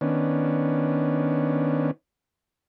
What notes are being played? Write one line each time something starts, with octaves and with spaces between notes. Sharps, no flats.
D#3 B3 C#4 D4